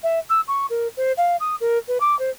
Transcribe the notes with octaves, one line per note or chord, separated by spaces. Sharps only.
E5
E6
C#6
A#4
C5
F5
D#6
A#4
B4
D6
C5